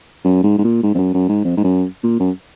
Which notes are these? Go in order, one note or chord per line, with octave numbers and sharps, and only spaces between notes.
F#2
G#2
G#2
A#2
G#2
F2
F#2
F#2
G#2
F2
G#2
F#2
A#2
F#2